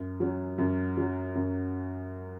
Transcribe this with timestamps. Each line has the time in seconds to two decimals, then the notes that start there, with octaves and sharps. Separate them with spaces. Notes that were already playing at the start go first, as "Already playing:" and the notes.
Already playing: F#2
0.20 F#3 C#4
0.58 F#2
0.97 F#3 C#4
1.35 F#2